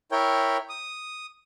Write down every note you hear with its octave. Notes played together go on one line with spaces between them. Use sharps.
E4 A#4 C#5 G5
D#6